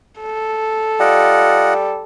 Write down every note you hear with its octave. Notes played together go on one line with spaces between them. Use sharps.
A4
G3 F4 D#5 F#5